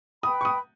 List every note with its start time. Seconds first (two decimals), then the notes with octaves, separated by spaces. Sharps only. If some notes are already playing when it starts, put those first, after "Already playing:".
0.23 B4 G5 B5 D#6
0.41 C#6
0.45 D#6